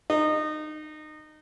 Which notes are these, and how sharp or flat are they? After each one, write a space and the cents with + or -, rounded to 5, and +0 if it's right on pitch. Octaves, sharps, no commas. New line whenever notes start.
D#4 -25